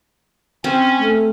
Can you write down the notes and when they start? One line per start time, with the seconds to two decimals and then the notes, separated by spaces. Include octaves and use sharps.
0.64 C4 C#4
0.98 A3